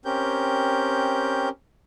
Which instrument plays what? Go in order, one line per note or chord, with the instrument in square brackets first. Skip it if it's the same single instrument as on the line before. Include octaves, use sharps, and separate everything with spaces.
[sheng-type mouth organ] C4 C#4 G4 A#4 G6